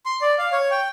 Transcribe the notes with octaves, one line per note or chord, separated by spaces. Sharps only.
C6
D5
F5
C#5
G5